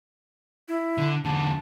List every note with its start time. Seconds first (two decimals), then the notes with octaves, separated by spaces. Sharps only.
0.68 E4
0.98 D3
1.25 E2 D3 A5